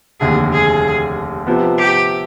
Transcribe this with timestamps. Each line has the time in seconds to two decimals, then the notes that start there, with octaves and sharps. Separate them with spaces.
0.20 F1 D#2 D3 G#4
0.53 G#4
1.47 C3 F3 B3
1.78 G4